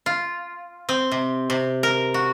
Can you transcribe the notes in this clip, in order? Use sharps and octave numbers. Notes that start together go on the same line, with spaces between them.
F4
C4
C3
C3
A#4
F#4